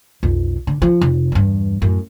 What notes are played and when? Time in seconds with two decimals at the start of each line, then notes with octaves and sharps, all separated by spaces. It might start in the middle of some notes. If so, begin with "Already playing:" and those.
0.23 B1 F2
0.67 D3
0.82 F3
1.01 F1
1.32 E2 G2
1.82 F#2 A2